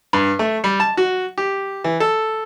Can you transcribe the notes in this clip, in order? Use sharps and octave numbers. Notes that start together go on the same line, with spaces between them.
G2
A3
G3
A5
F#4
G4
E3
A4